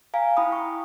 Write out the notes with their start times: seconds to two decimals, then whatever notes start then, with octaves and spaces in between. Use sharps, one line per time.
0.14 F5 G#5 A#5
0.37 E4 G5 B5 D#6
0.52 C#6